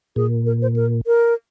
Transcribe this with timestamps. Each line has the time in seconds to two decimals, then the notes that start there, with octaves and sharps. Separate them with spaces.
0.16 A#2 G#4
0.46 A#4
0.62 C5
0.76 A#4
1.07 A#4